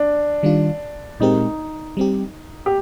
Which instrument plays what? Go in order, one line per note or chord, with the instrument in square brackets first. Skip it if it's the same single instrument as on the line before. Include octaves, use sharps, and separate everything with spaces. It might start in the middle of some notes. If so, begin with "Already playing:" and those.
Already playing: [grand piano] D4
[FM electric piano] D#3 G3 D4 F4
[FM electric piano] A#2 G#3 C4 G4 A#4 [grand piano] D#4
[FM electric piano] G3 C4 G4
[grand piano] G4